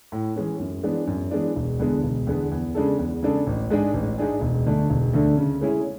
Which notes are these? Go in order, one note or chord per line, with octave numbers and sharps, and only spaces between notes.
A2
E3 G#3 C#4
F#2
E3 G#3 B3 D4
F#2
E3 G#3 B3 D4
E1
E2 D3 G#3 B3
E1
E2 D3 G#3 B3
E2
C#3 G#3 D4 A4
E2
C#3 G#3 D4 A4
A1
G#2 G#3 D4 G#4
A1
G#2 G#3 D4 G#4
E1
D2 D3 A3 D4
E1
D2 D3 A3 D4
C#3
G#3 C#4 E4 G#4